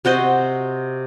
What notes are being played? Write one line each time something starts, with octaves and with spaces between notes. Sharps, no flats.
C3 F#4 C5 D#5